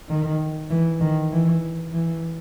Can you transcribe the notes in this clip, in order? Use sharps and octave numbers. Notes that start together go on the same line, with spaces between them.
D#3
E3
D#3
E3
E3